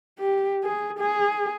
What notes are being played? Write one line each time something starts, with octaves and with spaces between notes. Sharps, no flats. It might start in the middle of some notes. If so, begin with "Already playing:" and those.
G4
G#4
G#4